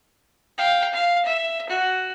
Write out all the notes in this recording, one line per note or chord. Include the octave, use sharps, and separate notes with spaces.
F5 G5
F5
E5
F#4